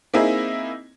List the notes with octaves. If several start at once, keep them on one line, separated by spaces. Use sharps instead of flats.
A#3 C4 D#4 E4 G#4